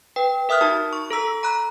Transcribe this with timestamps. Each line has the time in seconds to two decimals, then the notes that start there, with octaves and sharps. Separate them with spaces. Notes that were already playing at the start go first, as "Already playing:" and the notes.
0.16 B4 G5
0.49 A#4 E5 D#6 F6 F#6
0.61 D#4 F#4 A5
0.93 C#6
1.11 A4 A#5 E6 B6
1.43 A#5 B5 F#6